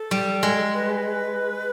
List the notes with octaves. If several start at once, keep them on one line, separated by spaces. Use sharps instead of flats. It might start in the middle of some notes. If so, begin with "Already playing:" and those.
Already playing: A4
G3
G#3
B4